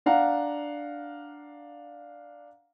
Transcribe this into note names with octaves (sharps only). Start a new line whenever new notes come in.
D4 F5 F#5 A#5